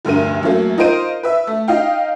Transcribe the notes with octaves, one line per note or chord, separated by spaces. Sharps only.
F1 D2 G2 A#4 D#7
F#2 E3 F#3 A3 A#3
D#4 F4 A#4 C5 D7 D#7
B4 E5
A3
D#4 F5 G5